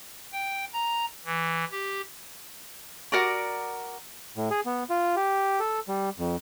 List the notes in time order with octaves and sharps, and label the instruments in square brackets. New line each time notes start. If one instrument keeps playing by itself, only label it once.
[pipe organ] G5
A#5
E3
G4
[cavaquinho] F#4 A#4 D5 D6
[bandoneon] A2
G#4
B3
F4
G4
A4
G3
F2